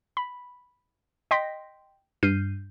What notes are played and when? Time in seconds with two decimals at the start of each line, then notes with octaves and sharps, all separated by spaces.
0.17 B5
1.31 D#5 G5 C6 A#6 B6
2.23 G2 F6 G6 C7 D#7